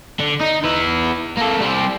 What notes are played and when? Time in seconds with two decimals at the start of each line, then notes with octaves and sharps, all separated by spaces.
0.19 D3
0.40 D#4
0.64 B3 E4
1.38 A#3 A4
1.61 G3 C4